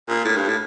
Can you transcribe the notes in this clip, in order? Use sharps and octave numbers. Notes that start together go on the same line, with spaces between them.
A#2
A2
G2
A2